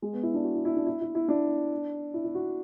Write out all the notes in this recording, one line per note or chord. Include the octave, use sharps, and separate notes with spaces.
G#3
B3
E4
D4
F#4
E4
E4
D4
E4
E4
E4
D4
E4
E4
F#4